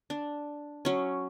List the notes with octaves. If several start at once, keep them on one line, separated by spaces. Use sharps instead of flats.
D4
F#3 C#4